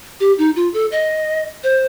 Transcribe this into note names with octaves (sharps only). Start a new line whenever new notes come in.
G4
D#4
F4
A4
D#5
C5